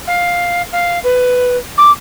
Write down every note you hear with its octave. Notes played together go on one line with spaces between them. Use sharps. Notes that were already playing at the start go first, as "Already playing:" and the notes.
F5
F5
B4
D6